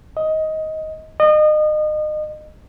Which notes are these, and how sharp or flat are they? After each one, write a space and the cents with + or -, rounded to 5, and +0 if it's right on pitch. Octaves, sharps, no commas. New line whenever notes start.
D#5 +15
D#5 -30